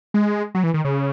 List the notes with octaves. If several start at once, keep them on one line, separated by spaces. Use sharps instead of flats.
G#3
F#3
E3
D#3
C#3